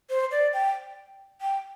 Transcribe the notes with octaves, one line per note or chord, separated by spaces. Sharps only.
C5
D5
G5
G5